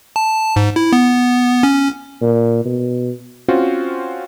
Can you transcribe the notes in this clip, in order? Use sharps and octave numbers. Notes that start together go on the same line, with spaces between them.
A5
G#2
E4
B3
C#4
A#2
B2
C4 C#4 F4 F#4 C5